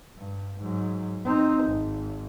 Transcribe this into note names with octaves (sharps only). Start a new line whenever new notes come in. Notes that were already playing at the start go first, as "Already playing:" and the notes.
G2
G#2 F#3
C4 D#4
G#1